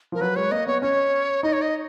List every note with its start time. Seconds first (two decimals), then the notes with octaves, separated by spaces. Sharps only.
0.12 F3 A#4
0.21 F#3 B4
0.36 G#3 C#5
0.51 A#3 D#5
0.67 B3 C#5
0.82 C#4 C#5
1.43 D#4 D#5
1.53 C#5
1.62 D#5